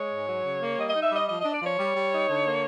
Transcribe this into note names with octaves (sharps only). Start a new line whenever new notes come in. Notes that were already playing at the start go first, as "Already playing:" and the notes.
Already playing: G#3 C#5
G#2
F#3
C#3
A#3
G3 D#5
D#4 D#5
E5
G3 D#5
F3 D#5
D4 D#5
D5
F3 C#5
G3
G3
D#4
D3
A#3